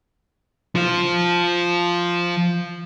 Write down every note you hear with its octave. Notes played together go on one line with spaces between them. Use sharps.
F3 F4